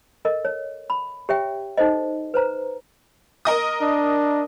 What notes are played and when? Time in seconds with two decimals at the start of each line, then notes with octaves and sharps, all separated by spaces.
0.25 A4 A#4 D#5
0.45 C#5
0.90 B5
1.29 G4 C#5 E5 G5
1.77 D#4 A4 C5 D#5
2.34 B4 C5 A#5
3.45 A#4 D#5 D#6
3.81 D4